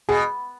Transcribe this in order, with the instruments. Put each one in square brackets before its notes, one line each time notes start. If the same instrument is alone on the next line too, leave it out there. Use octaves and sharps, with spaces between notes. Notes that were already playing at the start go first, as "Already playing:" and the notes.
[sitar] B2 [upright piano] G#4